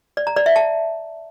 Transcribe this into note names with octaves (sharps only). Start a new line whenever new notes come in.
D5
A#5
D5
E5
A5